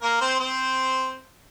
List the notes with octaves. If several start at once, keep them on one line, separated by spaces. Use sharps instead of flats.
A#3 A#4
C4 C5
C4 C5